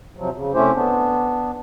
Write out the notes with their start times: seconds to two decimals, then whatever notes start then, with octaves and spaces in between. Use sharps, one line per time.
0.16 C3 F3 F#3
0.35 C#3
0.54 C3 A3 C#4 E4 G4 C5
0.74 B3 D4